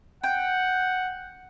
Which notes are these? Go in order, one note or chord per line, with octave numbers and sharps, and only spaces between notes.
F#5 G5